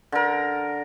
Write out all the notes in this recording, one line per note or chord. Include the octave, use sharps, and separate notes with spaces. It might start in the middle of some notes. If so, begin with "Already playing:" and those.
D3 A#4